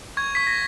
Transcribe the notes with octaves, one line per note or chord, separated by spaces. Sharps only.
C#6 G#6
C#6 B6
A#6